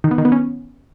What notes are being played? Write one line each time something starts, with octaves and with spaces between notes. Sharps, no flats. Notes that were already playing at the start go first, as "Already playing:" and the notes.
D#3
B3
D#3
B3
C#4